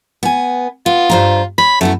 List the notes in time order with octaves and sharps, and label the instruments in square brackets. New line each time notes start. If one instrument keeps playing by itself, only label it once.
[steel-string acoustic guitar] B3 G#5
[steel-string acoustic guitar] B3 [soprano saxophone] F4
[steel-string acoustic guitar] G2 C5 A#5
[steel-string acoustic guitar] C#5 [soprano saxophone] B5
[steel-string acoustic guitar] F#2 B3 E4 [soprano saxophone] A3